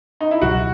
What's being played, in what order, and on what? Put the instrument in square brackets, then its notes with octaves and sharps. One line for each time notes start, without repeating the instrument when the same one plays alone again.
[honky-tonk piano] D#4
E4
[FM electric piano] C#2 B2 F#3 [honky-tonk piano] F#4